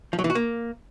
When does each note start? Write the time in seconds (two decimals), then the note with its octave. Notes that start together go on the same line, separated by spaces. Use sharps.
0.13 F3
0.19 F#3
0.24 E3
0.30 F#4
0.35 A#3